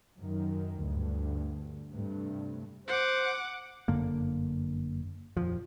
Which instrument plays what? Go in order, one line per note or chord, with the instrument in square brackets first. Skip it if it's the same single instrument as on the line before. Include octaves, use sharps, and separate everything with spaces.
[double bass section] F#2 D#3
D2 G2
G2 C3 A3
[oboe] C5 [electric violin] F#5 D6
[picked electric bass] G1 F#2 D3 A#3
D#1 F2 F3